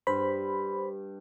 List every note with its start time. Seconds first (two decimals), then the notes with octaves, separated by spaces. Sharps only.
0.07 G2 C5 B5